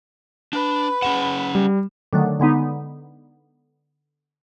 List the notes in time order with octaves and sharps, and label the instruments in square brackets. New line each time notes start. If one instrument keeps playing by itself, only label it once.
[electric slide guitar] D4 [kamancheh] B4
[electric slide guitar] C#4 G#4 F#5 [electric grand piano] E7
[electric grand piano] G3
[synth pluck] D3 D#3 F#3 A3
D3 G#3 B3 D#4